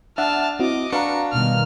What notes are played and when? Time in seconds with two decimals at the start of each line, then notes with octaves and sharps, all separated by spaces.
0.18 D4 E5 F#5 A5 F6
0.59 C4 E4 F#4 D#5 D6
0.92 D4 F#4 B4 F5 A#5 C#7
1.33 B2 D#3 G3 F6